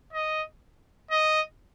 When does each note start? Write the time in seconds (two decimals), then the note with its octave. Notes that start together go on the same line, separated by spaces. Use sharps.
0.13 D#5
1.11 D#5